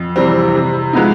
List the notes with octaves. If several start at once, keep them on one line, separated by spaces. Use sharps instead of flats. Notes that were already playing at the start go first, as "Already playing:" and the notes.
Already playing: F2
C3 E3 G3 C4
C3
F3 G#3 B3 D#4